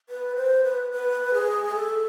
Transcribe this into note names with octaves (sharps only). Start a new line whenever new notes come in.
B4
C5
B4
B4
G#4
A4